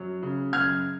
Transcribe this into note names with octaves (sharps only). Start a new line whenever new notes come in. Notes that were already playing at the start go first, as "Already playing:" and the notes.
Already playing: F#2 F#3
C#3
F#2 F6 G#6